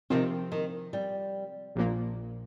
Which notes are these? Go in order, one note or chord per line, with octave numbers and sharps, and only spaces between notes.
C3 D#3 F3 C4
D#3
G3
A#1 A#2 F3 A#3